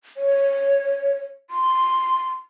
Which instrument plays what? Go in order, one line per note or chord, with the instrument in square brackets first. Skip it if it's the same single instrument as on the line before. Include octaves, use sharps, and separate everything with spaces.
[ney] C#5
C6